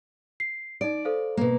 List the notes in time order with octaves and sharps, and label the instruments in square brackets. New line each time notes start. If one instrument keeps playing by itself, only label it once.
[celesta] C7
[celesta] D#4 D7 [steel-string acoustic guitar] D5
[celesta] A4 C5 F5
[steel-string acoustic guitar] B2 A#3